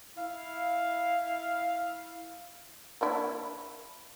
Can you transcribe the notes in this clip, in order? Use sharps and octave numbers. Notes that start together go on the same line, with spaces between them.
E4 F5
A#3 D4 E4